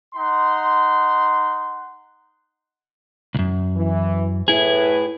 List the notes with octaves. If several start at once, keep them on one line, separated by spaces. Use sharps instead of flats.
D#4 F#5 C6
C2 F#2
E3
A2 E4 G#4 B4